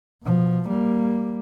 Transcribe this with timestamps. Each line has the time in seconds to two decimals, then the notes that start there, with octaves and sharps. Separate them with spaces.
0.23 B2 F3
0.68 G3 A#3